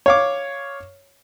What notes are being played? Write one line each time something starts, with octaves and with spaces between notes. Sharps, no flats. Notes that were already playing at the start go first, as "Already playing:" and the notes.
C#5 F5 D6